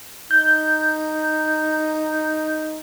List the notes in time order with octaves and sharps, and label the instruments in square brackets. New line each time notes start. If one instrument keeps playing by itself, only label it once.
[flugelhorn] D#4 [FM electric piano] G6